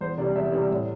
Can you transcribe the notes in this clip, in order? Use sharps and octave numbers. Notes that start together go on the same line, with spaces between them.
E2 C5
C3 G3 D5
E2 E5
C3 G3
A2